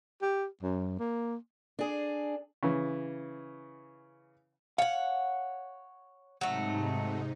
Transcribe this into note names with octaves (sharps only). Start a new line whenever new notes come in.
G4
F#2
A#3
D4 G#4
C#3 E3
C#5 F5 F#5
G#2 C3 F#3 A3 D#4